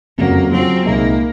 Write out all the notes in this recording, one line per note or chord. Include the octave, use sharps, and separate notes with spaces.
F#1 F2 C#3 F#3 A#3
C#3 F#3 C4 C#4 F4
C2 A#2 G#3 A#3 D#4